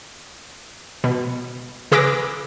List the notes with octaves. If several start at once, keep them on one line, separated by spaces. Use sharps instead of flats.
B2
C#3 G#4 B4 D6 E6 A#6